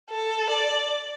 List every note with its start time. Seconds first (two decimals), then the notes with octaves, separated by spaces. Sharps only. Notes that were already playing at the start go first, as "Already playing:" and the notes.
0.10 A4
0.50 D5